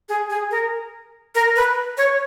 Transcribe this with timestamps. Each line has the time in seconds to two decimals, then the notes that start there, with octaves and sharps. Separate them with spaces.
0.09 G#4
0.30 G#4
0.51 A#4
1.35 A#4
1.56 B4
1.98 C#5